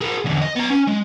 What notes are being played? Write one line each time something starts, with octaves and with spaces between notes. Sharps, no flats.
G#4 A#4
E2 D3
D#5
B3 A#5
C#4
G#3